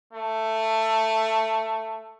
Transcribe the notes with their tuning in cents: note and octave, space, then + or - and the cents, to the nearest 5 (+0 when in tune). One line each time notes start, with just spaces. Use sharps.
A3 +10